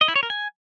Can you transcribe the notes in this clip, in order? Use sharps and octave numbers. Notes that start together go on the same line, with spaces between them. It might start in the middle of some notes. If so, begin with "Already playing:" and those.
D#5
E4
C#5
A#4
G#5